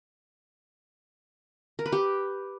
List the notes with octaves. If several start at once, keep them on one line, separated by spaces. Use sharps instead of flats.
A#4
B4
G4